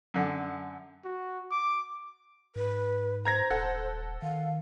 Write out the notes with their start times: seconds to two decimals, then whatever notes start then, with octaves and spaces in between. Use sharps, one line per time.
0.14 F#2 D3
1.05 F#4
1.51 D6
2.56 G#2 B4
3.25 C5 A#5 G#6 A#6
3.50 D#1 A4 F#5
4.22 D#3 F5